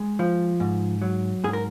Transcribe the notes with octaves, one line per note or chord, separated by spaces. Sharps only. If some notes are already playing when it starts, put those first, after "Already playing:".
Already playing: G#3
F3
G#2
F#3
G#2 G#4
A#4